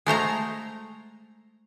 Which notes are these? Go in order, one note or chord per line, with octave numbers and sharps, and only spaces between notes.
G#3 A3 C5 A#5